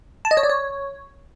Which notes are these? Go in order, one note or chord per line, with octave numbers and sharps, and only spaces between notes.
A5
D#5
C#5
D5
C#5